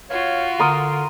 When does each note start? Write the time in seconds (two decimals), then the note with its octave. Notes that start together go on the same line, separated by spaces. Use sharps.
0.10 F4 F#4 C#5 F5
0.59 D3 A#4 C6 D#6